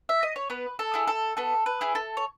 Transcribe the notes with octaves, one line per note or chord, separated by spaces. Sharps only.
E5
D#5
C#5
B3 B4
A4
E4 G#4
A4
B3 A4
B4
E4 G#4
A4
C#5